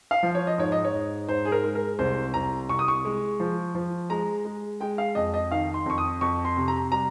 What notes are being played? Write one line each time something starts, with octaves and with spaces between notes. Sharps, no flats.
F5
F3
C#5
D#5
G#2 C#5
D#5
C#5
G#2
G#2 C5
G#4
A#4
G#3
A#4
C2 C5
C2 A#5
C2 C#6
D#6
C#6
G#3
F3
F3
G#3 A#5
G#3
G#3 G5
F5
F2 D#5
D#5
D#3 F5
C6
F2 C#6
D#6
F2 C#6
C6
C3
A#5
G3 A#5